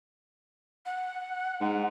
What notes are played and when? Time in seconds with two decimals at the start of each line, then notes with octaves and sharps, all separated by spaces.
0.86 F#5
1.61 G#2